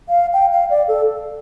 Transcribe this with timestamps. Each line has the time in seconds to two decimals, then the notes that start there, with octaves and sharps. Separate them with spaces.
0.09 F5
0.33 G5
0.52 F5
0.70 D5
0.88 A4